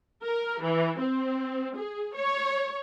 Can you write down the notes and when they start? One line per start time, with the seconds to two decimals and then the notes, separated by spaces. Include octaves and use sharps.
0.23 A#4
0.64 E3
1.01 C4
1.76 G#4
2.16 C#5